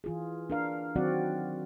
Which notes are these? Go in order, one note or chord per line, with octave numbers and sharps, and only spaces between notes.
E3 F4 G#4
D4 A#4 F5
D#3 F#3 C4 F#4 D5 F#5